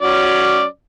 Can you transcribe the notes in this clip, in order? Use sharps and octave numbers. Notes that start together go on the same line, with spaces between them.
F#3 C#4 D5